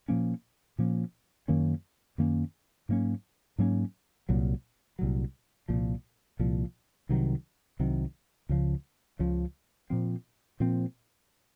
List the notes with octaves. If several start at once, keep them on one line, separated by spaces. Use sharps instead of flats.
A#2 F3 A#3 C#4
A#2 F3 A#3 C#4
F#2 D#3 A#3 C#4
F#2 D#3 A#3 C#4
G#2 F#3 A#3 C#4
G#2 F#3 A#3 C#4
C2 A#2 F#3
C2 A#2 F#3
C2 A#2 F3
C2 A#2 F3
C2 C3 D#3 F#3
C2 C3 D#3 F#3
C#2 C#3 F3
C#2 C#3 F3
A#2 F3 C4
A#2 F3 C4